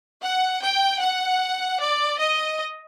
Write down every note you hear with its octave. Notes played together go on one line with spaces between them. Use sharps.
F#5
G5
F#5
D5
D#5